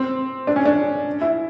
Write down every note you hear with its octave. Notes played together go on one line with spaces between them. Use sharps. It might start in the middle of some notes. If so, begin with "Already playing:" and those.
Already playing: C4
D4
C#4
D4
E4